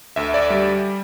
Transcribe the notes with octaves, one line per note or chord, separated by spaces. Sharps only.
D2 E5
D5 E5
G3